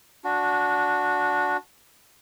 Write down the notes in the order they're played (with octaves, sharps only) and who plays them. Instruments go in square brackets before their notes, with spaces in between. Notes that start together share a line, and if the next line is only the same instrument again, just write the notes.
[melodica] D4 F#4